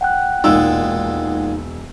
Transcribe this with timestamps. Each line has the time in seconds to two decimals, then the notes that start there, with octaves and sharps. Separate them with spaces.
0.01 F#5 G5 F#6
0.44 E1 A#2 G#3 D#4 E6